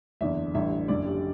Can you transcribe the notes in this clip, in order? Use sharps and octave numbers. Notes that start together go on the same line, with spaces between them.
F#1 E2 D3 E5
A1 G2 D3 E5
F#1 F#2 D3 D5
G4